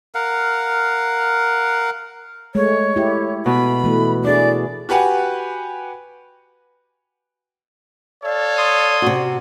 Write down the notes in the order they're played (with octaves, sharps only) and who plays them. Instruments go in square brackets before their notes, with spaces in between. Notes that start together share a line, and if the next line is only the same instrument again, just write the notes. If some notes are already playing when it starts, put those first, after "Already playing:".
[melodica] A#4 F5 F#5
[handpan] G#3 A3 [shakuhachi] C#5
[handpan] E4 G4
[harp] B2 [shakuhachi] B5
[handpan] E3 A3 B3
[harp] D4 [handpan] E4 G#4 [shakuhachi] D5
[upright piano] F#4 G4 B4 F#5 G#5
[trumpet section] A4 C#5 F5 [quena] D5
[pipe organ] C6 D#6
[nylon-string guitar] C3 F#4